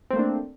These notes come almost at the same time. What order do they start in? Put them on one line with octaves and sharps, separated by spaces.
C4 A3 A#3 D4